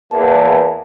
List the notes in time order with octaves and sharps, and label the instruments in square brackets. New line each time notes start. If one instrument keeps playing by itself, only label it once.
[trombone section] E2 A#3 [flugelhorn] A5